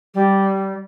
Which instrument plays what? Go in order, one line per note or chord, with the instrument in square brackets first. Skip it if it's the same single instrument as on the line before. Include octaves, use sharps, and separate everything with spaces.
[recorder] G3